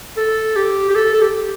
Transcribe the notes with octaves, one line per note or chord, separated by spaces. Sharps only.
A4
G4
G4
A4
A4
G4